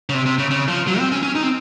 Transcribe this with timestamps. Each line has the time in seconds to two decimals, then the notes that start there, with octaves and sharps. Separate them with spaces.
0.09 C#3
0.14 C3
0.26 C3
0.38 C#3
0.51 C#3
0.68 F3
0.87 F#3
0.99 C4
1.12 C#4
1.23 C#4
1.35 D#4
1.43 C4